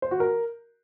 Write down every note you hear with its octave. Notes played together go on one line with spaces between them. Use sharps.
C5
F#4
A#4